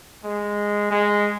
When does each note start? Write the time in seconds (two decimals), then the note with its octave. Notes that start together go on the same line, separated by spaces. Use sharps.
0.24 G#3
0.91 G#3